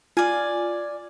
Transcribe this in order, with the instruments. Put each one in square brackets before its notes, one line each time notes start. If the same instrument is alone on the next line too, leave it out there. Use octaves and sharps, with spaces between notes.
[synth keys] F4 G#6 [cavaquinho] D5 G#5